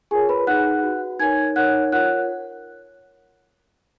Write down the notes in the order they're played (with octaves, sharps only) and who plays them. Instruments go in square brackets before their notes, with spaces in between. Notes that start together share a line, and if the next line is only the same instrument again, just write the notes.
[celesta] F4 G#4 A#4 C#5 G#5
B4 B5
D#4 G#4 B4 F#5 F#6
F#4 B4
D#4 A#4 C#5 G#5 G#6
D#4 A#4 C#5 F#5 F#6
F4 A#4 C#5 F#5 F#6